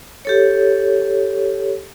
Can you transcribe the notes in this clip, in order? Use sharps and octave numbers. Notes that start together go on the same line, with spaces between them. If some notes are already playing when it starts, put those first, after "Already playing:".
G4 A4 C#5